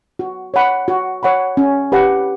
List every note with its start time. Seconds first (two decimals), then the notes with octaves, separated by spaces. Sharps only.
0.19 F#4
0.54 C#5 F#5 B5
0.88 F#4
1.23 C#5 F#5 B5
1.57 C#4
1.92 G4 B4 F#5